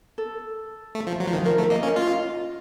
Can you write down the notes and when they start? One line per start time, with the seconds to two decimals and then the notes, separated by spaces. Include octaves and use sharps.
0.18 A4
0.95 A3
1.07 F3
1.20 F#3
1.28 F3
1.33 D#3
1.45 F3 A#4
1.58 A3
1.70 A#3 D#5
1.83 C#4
1.96 F4 D#5